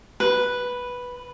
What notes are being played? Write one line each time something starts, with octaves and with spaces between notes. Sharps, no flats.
B4